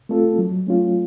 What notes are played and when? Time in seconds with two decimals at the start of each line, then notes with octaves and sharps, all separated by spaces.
0.09 A3 C4 F4 A4
0.38 F#3
0.67 A3 C#4 F4